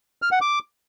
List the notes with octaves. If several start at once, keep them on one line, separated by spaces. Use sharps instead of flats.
F6
F#5
D6